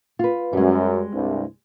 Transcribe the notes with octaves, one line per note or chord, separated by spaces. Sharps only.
F4 B4
F#2 G3 G#3
C2 G2